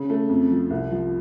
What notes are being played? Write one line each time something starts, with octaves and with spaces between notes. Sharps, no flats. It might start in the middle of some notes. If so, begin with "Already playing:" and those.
Already playing: C#3
A3
F2
F3
C2
F3